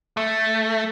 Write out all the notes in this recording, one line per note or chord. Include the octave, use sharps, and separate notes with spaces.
A3